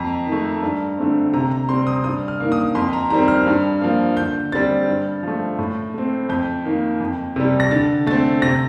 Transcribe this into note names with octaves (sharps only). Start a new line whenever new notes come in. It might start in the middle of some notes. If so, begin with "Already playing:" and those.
Already playing: F2 A#5
D#3
A3
G2
D3 A3 C4
C3 A#5
A#5
G3 C4 C6
D#6
G2 D#6
F6
D#3 A#3
D#6
F2 C6
A#5
D#3 G3 C4 A#5
F6
G2
F3 A#3
D3 G6
G3 C4 A6
G2
F3 A3
A2
A3 C4
F2 G6
D#3 A#3
F2
C3 G3
A#6
D3 A6
A3 C4 A6
C3 A#6